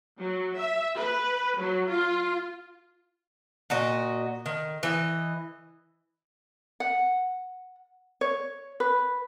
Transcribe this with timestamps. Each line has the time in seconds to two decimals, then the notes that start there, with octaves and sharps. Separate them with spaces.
0.19 F#3
0.57 E5
0.96 B4
1.59 F#3
1.90 F4
3.70 A#2 F#4 D#5
4.46 D#3
4.83 E3 D#5
6.80 F#5
8.21 C#5
8.80 B4